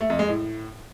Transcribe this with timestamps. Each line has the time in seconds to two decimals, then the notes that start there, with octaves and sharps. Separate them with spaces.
0.01 A3
0.10 F2
0.19 G#3
0.28 A2